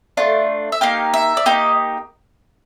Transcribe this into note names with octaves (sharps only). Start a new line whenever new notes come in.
A3 D4 F4
E5
A#3 D#4 G4 F5
E5
D5
A#3 D#4 G4 D#5